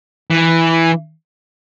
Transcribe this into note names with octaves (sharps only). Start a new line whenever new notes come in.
E3